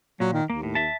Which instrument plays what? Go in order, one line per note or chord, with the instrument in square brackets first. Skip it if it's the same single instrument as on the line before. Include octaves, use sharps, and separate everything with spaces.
[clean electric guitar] A#2 [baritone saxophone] F#3
[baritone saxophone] D#3
[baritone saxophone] D#2 [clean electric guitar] A#3
[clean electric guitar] A2
E5 A5